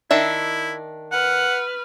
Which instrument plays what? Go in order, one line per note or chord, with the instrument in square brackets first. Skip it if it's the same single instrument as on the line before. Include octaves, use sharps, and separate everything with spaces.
[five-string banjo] D#3 D4 E5 [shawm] E4
[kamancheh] B4 F6 [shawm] F#5